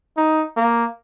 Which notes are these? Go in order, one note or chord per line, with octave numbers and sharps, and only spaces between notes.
D#4
A#3